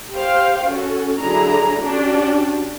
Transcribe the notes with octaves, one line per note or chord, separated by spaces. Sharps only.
G4 C5 F5 G5
C#4 F#4 A4
D3 F#3 D4 E4 G#4 A#5
C#4 D4 F#4 G4